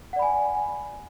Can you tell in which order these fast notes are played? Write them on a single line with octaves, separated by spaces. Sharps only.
F#5 D5 B5 G#5